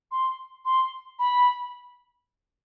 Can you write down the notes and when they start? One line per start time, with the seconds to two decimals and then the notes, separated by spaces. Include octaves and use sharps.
0.11 C6
0.65 C6
1.19 B5